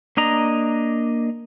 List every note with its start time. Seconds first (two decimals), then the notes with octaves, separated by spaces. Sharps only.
0.17 A#3 D4 D#5 A#5